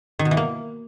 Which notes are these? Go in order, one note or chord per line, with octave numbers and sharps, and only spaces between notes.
D#3
B2
E3
A#3